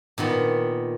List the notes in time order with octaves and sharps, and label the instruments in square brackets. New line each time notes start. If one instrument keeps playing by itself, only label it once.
[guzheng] A#2 D#3 B3